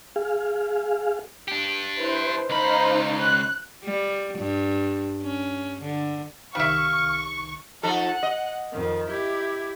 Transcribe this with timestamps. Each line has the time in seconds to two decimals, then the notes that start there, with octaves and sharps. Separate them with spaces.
0.16 G#4 F5
1.48 D4 G4
1.97 E4 B4 C5
2.50 C#2 D#4 C5 F5 B5
3.22 F#6
3.84 G3
4.38 G2
5.23 C#4
5.82 D3
6.55 C2 D#3 G3 E5 F5 C#6 F#6
7.83 F3 D#4 A4 F#5 F#6
8.23 D#5
8.72 F2 D#3
9.10 E4 G4 G#6